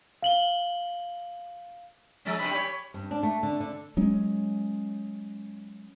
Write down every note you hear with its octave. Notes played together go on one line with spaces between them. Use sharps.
F5 F#7 G7
F3 G#3 C#4
G2 C3 B5
G4 C#5
G2
D4
A3
D3
D3
F#3 G#3 C#4